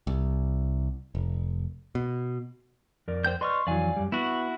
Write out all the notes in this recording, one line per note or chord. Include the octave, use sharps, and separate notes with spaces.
C2
F1
B2
F2 A#4 D5
C5 G5 G6
B4 D5 D#5 C6 C#6 F6
F2 E3 F#3 D5 F5 G#5
F#2 G3
B3 E4 F#4